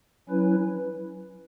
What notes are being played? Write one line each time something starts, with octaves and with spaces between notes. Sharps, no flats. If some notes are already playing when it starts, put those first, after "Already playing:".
F#3 C#4 E4 B4